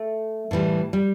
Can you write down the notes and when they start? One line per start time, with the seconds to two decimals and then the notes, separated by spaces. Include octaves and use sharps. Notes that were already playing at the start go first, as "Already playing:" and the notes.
Already playing: A3
0.51 A2 E3 G3
0.93 G3